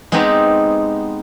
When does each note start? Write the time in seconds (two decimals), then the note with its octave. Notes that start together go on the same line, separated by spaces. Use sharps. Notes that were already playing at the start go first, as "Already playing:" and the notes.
0.12 G#3 B3 C4 D#4 G4